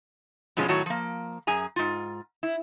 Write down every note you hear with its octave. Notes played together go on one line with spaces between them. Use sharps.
G2 B2 F3 G#3 C#4
A2 D#3 F#3 F#4 C#5 A5
F3 A#3
F#2 G#4 G#5 A#5
G#2 F4
E4